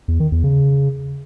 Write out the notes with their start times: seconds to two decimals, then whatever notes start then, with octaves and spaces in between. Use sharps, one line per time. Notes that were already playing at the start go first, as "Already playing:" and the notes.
0.08 E2
0.20 D#3
0.32 E2
0.44 C#3